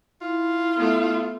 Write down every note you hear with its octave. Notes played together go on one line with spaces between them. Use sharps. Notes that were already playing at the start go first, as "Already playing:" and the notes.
E4 F4
A3 B3